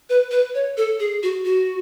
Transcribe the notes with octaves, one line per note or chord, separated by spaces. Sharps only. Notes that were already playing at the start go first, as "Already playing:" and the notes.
B4
B4
C#5
A4
G#4
F#4
F#4